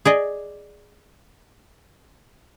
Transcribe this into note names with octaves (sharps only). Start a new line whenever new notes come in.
G#4 D5 D#5